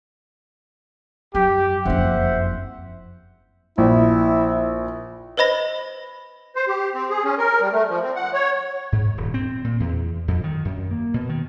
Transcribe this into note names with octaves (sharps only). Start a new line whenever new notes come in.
F#2 G4
F#1 F2 C5 E5 F#5
A#1 E4
B4 C5 D#5 B5 A#6
C5
G4
C4
G#4
C#4
A#4
G3
A3
F3
C4
F#5
C#5
G#2
D#1
C4
A#2
E2
F2
D#3
F#2
A#3
B2
D#3